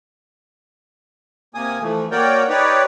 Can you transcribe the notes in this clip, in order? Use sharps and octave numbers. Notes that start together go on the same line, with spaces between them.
C3 A#3 G#5 D#6
E3 F3 A3
A#3 F#4 A#4 C#5 D5 G5
D#4 G4 B4 C#5 D5